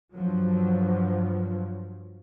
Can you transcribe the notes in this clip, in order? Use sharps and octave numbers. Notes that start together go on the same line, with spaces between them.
G2 F3 F#3